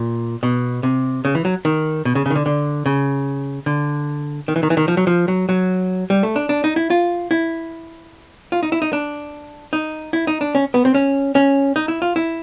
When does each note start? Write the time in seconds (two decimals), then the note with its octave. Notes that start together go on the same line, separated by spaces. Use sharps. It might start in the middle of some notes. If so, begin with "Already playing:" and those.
Already playing: A#2
0.43 B2
0.83 C3
1.25 C#3
1.35 E3
1.45 F#3
1.65 D#3
2.05 B2
2.15 C#3
2.26 C#3
2.30 D#3
2.36 D3
2.46 D3
2.86 C#3
3.66 D3
4.48 D#3
4.56 E3
4.63 D#3
4.70 E3
4.77 D#3
4.88 F3
4.97 F#3
5.07 F3
5.28 F#3
5.49 F#3
6.10 G3
6.23 A3
6.36 D4
6.49 D4
6.64 D#4
6.76 E4
6.90 F4
7.31 E4
8.52 F4
8.63 D#4
8.72 E4
8.82 D#4
8.93 D4
9.73 D#4
10.13 E4
10.27 D#4
10.41 D4
10.55 C#4
10.74 B3
10.85 C4
10.95 C#4
11.35 C#4
11.76 D#4
11.88 E4
12.02 F4
12.16 E4